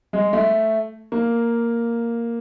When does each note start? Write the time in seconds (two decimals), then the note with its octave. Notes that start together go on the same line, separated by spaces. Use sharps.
0.13 G#3
0.33 A3
1.12 A#3